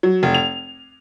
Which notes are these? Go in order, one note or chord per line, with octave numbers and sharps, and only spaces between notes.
F#3
F1
F7